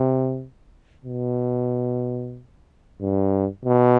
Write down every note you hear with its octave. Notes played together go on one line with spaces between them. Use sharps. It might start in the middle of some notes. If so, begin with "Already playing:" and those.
Already playing: C3
B2
G2
B2